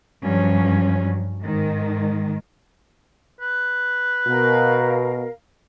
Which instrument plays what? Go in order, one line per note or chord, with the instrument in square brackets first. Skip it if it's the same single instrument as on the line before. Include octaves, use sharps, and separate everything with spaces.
[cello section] G2 F3 F#3 C#4
G#2 D#3
[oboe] B4
[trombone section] B2 [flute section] A#4 F5